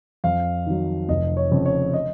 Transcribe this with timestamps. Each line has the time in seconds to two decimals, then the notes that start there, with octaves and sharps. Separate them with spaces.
0.24 F2 F5
0.67 D#3 F#3
1.09 F1 D#5
1.37 C#5
1.51 F2 C#3
1.66 C#5
1.94 D#5